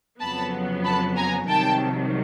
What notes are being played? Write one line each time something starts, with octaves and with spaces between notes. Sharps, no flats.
F2 C#3 F#3 B3 A5 B5
A5 B5
G#5 A#5
C2 C3 D#3 F#3 G5 A5